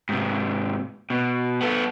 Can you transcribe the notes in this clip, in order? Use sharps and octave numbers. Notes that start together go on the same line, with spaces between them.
G#2 C3
B2
B3 A4